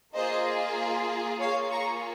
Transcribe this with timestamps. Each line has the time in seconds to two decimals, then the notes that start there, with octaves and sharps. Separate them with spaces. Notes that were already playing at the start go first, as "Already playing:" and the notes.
0.15 A#3 F4 G#4 C5 D#5
1.40 A#3 F4 G#4 C#5 F5
1.71 A#5 C#6